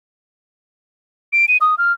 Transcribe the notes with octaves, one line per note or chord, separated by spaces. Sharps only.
D7
D#7
D#6
F6